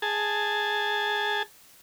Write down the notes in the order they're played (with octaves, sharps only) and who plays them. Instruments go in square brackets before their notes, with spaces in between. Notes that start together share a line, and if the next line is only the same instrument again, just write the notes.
[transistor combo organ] G#4 A5